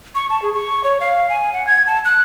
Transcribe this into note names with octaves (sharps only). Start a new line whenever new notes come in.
C#6
A5
G#4
C#6
C#5
F5
G#5
F#5
G#6
A5
F#6